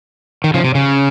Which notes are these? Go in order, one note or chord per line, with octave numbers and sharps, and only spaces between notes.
D#3
C#3 F3
C3
C#3